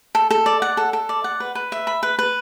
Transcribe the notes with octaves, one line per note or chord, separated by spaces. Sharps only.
A4
A4
D5
F#5
A4
A4
D5
F#5
B4
B4
E5
B5
B4
B4